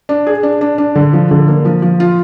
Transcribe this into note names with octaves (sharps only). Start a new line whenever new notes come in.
D4
G#4
D4
D4
D4
D3
F3
D3
A#3
F3
F3
F4